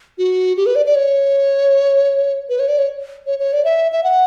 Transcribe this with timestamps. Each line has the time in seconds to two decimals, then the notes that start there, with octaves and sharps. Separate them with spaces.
0.18 F#4
0.57 G4
0.66 B4
0.76 D5
0.86 D5
0.95 C#5
2.49 B4
2.59 C#5
2.68 D5
2.78 C#5
3.26 C#5
3.39 C#5
3.53 D5
3.65 E5
3.92 E5
4.04 F#5